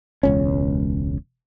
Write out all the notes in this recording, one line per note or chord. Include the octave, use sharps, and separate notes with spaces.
E1 C#2 C#4